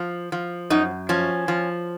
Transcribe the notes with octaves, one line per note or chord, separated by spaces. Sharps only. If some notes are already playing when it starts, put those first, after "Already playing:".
Already playing: F3
F3
F#2 D#4
F3 C#4
F3